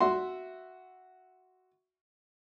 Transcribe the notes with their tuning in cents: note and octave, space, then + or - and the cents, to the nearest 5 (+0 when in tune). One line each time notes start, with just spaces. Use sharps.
F#4 +0 E5 +0 C6 +0